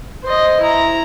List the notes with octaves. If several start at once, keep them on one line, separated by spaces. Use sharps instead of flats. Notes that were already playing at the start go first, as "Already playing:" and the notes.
C5 D#5
E4 A#5